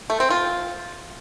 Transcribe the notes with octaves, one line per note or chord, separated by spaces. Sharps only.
A3
C4
F4